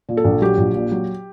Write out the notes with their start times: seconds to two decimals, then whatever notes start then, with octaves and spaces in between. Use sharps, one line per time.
0.09 A#2
0.17 A4
0.25 A#1
0.42 F#3 G4
0.58 A#1
0.75 A#2
0.92 F#3